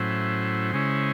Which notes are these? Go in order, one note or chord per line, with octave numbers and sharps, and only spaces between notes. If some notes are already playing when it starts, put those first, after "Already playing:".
Already playing: A2 F#3 C#4 E4 C5
C#3 G#3 C#4 E4